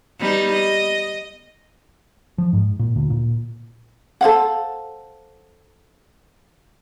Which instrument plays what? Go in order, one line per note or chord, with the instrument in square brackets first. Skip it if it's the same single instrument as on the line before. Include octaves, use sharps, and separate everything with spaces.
[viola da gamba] G3 B3 D#4
D#5
[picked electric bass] F3
G#2
A#2
D2
A#2
[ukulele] A4 C5 F5 F#5